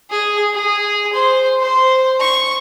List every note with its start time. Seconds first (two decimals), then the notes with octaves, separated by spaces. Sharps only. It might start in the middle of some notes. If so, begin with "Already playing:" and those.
0.10 G#4
0.54 G#4
1.13 C5
1.60 C5
2.20 C#6